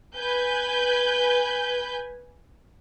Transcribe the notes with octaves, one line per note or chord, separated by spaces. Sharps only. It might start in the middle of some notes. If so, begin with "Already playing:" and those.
B4 G#5 G6